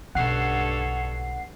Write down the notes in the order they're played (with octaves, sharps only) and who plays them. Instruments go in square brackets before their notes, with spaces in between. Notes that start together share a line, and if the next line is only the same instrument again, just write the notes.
[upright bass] B1 C#3 [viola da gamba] G2 A4 C#5 [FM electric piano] F#5 C7